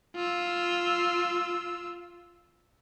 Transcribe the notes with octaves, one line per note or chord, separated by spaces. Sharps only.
F4 E6